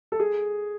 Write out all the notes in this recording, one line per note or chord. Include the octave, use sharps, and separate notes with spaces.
A4
G#4